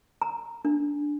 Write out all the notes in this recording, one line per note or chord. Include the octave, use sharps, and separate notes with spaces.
A#5
D4